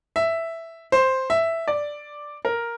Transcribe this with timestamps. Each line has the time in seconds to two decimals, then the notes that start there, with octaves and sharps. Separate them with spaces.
0.16 E5
0.92 C5
1.30 E5
1.68 D5
2.45 A#4